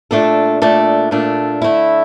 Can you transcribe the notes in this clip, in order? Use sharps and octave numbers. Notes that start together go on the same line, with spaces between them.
A#2 A3 D4 A4
A#2 A3 D4 A4
A#2 A3 D4 A4
D3 A3 E4